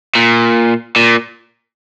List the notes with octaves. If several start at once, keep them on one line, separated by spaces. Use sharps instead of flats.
A#2
A#2